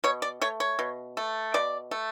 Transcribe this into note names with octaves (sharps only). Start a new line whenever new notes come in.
B2 C#5
D5
A3 C#5
C#5
B2
A3
B2 D5
A3